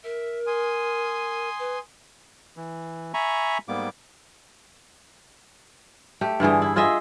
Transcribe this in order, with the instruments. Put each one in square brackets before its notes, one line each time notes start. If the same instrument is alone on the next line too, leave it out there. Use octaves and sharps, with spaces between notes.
[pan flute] A#4 [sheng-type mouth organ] E5
[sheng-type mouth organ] G#5 C6 D#6
[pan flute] B4
[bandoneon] E3
E5 G#5 A#5 B5 C#6
G#2 G3 A#3 B3 D6
[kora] A3 G4
G2 D3 E3 G#4
E4
F4 G#4 D#5 E5